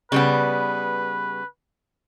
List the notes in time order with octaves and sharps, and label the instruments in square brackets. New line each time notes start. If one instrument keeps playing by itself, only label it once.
[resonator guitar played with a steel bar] C#3 G3 B3 [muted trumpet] B4